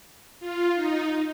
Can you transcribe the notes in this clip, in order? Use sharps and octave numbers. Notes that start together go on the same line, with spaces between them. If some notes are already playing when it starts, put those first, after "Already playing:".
F4
D#4